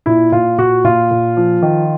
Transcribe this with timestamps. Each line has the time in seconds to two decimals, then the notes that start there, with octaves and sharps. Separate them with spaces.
0.06 A#2 E4
0.32 A#2 F4
0.58 A#2 F#4
0.84 A#2 F4
1.11 A#2
1.37 F3
1.62 D#3